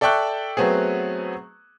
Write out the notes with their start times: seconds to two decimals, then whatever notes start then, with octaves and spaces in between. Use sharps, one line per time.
0.01 A4 D5 E5 G5 C#6 F#6
0.57 F#3 A3 B3 C4 G#4